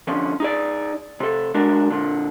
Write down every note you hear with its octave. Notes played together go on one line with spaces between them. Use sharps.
D3 F3 C#4
D#4 G#4 D5
C3 A4
G#3 D4 F#4 A#4
A#2 D3